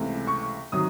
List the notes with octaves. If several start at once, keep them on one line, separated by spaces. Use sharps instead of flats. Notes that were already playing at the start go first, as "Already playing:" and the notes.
Already playing: C#2 C3 E3 A3
C#6
C3 D#3 F#3 D#6